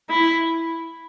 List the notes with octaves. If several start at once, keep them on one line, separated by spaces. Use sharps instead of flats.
E4